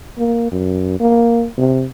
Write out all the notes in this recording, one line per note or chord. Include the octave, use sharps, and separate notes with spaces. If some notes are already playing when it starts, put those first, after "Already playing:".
A#3
F#2
A#3
C3